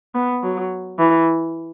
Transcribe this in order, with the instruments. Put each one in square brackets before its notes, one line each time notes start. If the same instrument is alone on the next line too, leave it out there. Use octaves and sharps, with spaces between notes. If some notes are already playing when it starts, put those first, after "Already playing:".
[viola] B3
F#3
E3